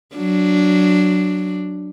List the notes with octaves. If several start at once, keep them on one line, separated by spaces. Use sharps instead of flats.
F#3 D4